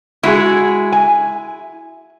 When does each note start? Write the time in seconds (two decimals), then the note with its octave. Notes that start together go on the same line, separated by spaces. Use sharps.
0.23 G#3 E4 F#4 G#4
0.92 G#5